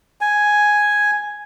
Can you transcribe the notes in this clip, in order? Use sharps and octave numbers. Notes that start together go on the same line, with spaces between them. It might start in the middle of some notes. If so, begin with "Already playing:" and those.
G#5